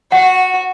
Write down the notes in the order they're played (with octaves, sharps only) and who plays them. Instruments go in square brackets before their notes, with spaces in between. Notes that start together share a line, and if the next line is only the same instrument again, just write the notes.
[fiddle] F#4 [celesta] F#5